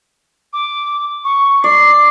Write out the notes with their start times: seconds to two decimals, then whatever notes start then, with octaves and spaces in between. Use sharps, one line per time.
0.53 D6
1.24 C#6
1.64 D5 C7